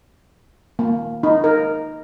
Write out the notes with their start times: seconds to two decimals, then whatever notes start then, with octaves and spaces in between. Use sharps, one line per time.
0.79 A#3
1.23 D#4
1.44 A#4